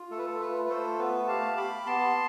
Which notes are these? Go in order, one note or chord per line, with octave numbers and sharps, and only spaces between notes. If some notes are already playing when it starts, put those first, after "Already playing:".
Already playing: F4
A3 A4
B4
A4
F4 B4
A3 A4 C5
B3 B4
G4 F5 A5
G4 B5 D6
B3 A5 C6